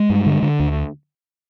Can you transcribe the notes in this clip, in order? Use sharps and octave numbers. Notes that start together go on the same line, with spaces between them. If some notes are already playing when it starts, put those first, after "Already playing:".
Already playing: G#3
G2
D3
D3
D2